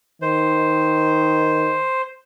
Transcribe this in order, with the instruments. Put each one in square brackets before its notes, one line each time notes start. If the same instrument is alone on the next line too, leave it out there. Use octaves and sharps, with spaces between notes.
[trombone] D#3 [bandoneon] C5